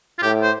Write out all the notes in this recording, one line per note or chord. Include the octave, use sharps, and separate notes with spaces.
F4
A2 G4
C5